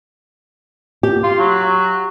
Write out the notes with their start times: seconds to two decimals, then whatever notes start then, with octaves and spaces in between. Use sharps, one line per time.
1.03 G4
1.24 F4
1.39 F#3